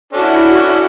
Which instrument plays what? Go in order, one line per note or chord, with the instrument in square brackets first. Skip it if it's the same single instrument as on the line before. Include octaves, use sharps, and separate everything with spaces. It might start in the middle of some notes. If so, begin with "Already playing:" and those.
[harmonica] C#4 D4 A4 [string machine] E4 F#4